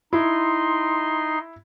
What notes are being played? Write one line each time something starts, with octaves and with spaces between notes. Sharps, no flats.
D#4 E4 C6